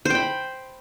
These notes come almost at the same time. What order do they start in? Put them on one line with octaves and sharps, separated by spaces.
C5 G5 B5